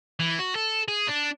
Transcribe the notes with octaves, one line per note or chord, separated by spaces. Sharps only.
E3
F#4
A4
G#4
D4